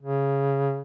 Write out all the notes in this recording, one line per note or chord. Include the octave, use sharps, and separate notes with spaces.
C#3